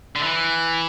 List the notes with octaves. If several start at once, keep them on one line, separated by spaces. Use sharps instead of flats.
D3
E3